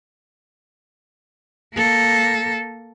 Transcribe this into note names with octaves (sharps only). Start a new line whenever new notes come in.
A#3 A4